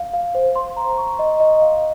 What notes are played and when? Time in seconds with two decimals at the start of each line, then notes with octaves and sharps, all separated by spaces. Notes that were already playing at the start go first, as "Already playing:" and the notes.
Already playing: F5
0.13 F5
0.35 C5
0.56 C6
0.77 A#5
0.98 C#6
1.19 D#5
1.40 D#5
1.62 F5